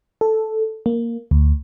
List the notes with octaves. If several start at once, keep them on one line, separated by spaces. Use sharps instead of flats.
A4
A#3
D2